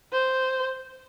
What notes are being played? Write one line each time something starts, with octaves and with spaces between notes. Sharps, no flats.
C5